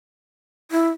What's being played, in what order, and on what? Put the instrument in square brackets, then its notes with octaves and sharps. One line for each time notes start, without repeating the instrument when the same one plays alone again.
[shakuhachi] E4